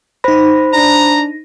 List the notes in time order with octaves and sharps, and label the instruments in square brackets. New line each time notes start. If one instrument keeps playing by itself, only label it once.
[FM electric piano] D#4 A#6 [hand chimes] C5 B5
[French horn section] D4 [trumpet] A#5